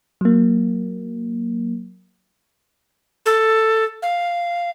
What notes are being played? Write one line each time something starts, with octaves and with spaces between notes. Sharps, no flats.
F#3 A#3
A4
F5